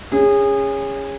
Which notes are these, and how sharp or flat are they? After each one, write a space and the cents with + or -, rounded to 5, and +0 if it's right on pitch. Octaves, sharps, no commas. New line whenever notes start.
C#4 +0 G#4 -25